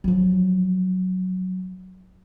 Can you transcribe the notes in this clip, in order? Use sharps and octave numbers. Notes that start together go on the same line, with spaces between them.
F3 F#3